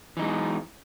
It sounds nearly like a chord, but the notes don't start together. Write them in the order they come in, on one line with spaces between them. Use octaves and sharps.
E3 D#4 G#3